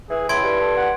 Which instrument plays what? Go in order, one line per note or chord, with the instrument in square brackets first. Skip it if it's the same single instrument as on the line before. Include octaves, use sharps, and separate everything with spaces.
[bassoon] E3 [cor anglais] G#4
[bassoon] C#2 [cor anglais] E4 [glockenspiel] C6 G#6 D7
[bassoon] G2
[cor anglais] A4
F#5